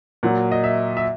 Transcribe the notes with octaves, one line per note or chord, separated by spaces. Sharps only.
A#2 F#3 F#5
D#5
E5
E5